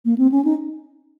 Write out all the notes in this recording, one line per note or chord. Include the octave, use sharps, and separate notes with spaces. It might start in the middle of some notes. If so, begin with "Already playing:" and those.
A#3
C4
C#4
D#4